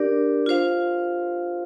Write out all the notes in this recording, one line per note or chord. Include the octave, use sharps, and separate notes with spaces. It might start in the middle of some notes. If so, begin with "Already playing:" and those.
Already playing: D4 G4 A#4 D5
F4 C5 F5